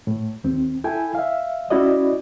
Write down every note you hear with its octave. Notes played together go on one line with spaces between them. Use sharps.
A2
D#2 C4
E4 A4 G5 G#5
E5 F5
C#4 E4 F#4 D5 D#5